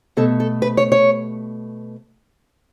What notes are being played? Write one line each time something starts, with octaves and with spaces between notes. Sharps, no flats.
B2 A3 A4
A4
B4
C#5
C#5